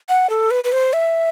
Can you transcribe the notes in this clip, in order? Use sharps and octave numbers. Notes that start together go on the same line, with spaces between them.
F#5
A4
B4
B4
C5
E5